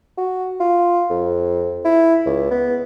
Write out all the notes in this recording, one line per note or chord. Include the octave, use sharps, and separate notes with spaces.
F#4
F4
F2
E4
C#2
B3